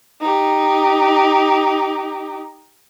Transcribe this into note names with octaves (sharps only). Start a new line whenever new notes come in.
D#4 G4